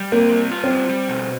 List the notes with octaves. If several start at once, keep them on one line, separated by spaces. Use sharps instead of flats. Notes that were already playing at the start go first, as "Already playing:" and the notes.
Already playing: G3
A#3 C4
G3
F4
C4
G3
G3
B2